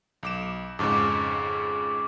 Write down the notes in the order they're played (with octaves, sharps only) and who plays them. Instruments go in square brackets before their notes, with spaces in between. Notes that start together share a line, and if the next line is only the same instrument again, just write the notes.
[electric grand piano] B1 D6 E7
[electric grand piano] F2 G#2 C#3 [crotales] C#6 D6